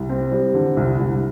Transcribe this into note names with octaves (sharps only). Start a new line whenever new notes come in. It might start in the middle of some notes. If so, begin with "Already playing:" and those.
Already playing: C2
C4
G3
D3
C2
C2